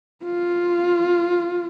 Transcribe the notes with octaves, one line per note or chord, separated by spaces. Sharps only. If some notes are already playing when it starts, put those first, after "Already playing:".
F4